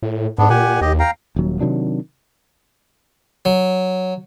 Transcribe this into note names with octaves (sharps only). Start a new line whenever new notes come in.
A2
G#2 B3 D4
A#2 G4 F#5 G#5
D#2 G4 D#5
F5 G5 A#5
D#1 D#2 F#3
C3 D#3 F#3 D4
F#3